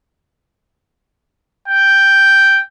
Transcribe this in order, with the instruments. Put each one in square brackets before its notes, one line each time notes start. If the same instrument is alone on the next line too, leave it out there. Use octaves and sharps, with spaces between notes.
[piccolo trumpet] G5